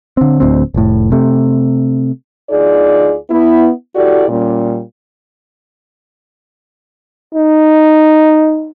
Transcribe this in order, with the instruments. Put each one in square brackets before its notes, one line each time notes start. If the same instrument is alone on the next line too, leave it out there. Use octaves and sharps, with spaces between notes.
[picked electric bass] D3 C4
D1 D2 C4
F1 A2
C3 A3
[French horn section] D2 D#4 F4 G#4 D5
B3 E4
E4 F#4 G4 A4 D5
A#2 G3 C#4
[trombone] D#4